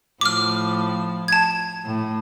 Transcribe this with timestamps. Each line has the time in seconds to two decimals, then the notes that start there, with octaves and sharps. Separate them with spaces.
0.21 A2 F3 D6 F6
1.28 A5 G#6
1.85 A2